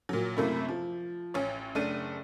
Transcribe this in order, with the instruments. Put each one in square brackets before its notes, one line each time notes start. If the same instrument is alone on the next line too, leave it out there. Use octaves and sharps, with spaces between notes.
[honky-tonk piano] A#2 F#3
F#2 C3 A3 A#3 E4
F3
A1 C#4 C#5
F#1 A3 D4 D#7